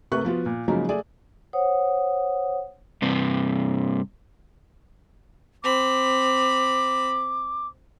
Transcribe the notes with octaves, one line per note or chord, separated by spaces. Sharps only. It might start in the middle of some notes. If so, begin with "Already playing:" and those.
C3 A3 A#4 B4 C#6 F#6
F3 B3 F4 F#4
A#2
C#3 F3 F#3 G#3 A#3 D#4
A3 G#4 D5
C5 C#5 F#5 D#6
G2 C3
C4 B5 D6